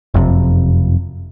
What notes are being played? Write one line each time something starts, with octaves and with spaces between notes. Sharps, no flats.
F#1 F2 A2 C3